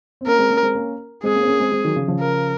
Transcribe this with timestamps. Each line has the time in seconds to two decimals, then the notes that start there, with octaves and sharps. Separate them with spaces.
0.21 C4
0.26 A#3 C#4 A#4
0.39 G#3 C4
0.50 A#3 C#4
0.63 G#3 C4
0.75 A#3 C#4
1.23 G#3 C4 G#4
1.35 A#3 C#4
1.41 C4
1.48 A#3 C#4
1.60 G#3 C4
1.72 G#3 C4
1.84 D#3 F#3
1.96 C#3 F3
2.08 C#3 F3
2.20 A#4